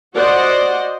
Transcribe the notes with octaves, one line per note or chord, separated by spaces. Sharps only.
F#4 C5 D5 D#5 F#5